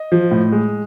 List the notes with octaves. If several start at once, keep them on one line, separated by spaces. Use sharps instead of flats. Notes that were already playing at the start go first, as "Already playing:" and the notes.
Already playing: D#5
F3
A2
G#3